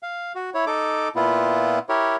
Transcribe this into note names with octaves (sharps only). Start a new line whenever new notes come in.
F5
F#4
E4 C#5
D#4 A4 D6
A#2 B3 E4 F4
E4 G4 A#4 C#5